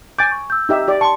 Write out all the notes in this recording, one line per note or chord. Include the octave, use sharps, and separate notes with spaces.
G#5 D6 G6 A6
C#6
E6 G6
D#4 G4 E5
G4 D5
A5 C6 C#6